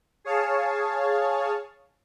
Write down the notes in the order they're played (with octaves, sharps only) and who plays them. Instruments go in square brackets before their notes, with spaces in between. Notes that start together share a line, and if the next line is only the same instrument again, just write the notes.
[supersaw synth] G#4 C#5 F5 A5